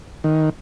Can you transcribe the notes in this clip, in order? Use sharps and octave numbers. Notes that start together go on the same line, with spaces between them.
D#3